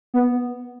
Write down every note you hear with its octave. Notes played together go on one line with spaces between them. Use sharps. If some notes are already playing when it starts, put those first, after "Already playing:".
B3